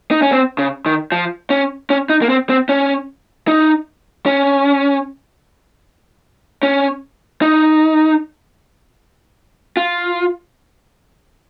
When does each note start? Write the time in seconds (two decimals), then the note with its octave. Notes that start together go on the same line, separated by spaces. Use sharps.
0.11 D#4
0.22 C#4
0.32 C4
0.58 C#3
0.86 D#3
1.12 F3
1.50 C#4
1.90 C#4
2.10 D#4
2.22 A#3
2.29 C4
2.50 C4
2.69 C#4
3.48 D#4
4.26 C#4
6.63 C#4
7.42 D#4
9.77 F4